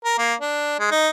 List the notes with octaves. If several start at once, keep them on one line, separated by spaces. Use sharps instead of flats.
A#4
A#3
D4
G#3
D#4